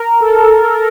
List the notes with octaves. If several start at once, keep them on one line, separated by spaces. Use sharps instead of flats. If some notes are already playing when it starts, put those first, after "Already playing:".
Already playing: A#4
A4